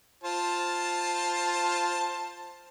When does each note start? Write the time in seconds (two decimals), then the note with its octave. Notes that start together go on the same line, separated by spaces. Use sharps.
0.24 F4 C5 A5